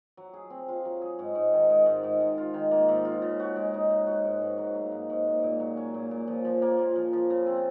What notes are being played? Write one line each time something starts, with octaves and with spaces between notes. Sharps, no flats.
F#3
G#4
C4
F4
F#3
G#4
G#2
G#2
D#3
G#3
G#2
G#2
G#2
F4
D#3
A#3
G#2
F4
C#3
F#4
G#3
D#4
C#3
F#4
G#2
G#2
F#3
A#3
G#2
G#2
A#2
A#2
F#3
C#4
A#2
A#2
F3
F3
A#3
F4
F3
F3
C#3
C4